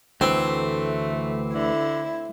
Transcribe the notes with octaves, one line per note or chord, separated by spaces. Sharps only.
D2 E3 A3 C4
D3 E4